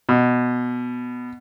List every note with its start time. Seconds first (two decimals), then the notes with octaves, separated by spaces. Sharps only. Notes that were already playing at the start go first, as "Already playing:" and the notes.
0.09 B2